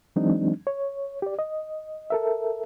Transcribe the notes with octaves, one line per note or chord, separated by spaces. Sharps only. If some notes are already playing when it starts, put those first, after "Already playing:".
E3 F#3 G#3 C4 D4 D#4
C#5
G4 D5
D#5
A4 A#4 E5